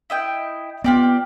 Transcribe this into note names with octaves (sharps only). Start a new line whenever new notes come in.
E4 D#5 G5
B3 F4 G4 D5